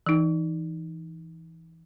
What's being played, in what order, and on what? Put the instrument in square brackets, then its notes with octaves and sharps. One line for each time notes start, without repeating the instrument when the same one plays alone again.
[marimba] E3 D#4